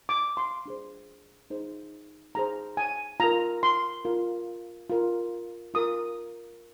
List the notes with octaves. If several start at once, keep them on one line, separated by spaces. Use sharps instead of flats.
D6
C6
D4 G#4 C5
D#4 G#4 C5
D#4 G#4 C5 A#5
G#5
F4 A#4 A#5
C6
F4 A#4
F4 A#4
F4 A#4 D#6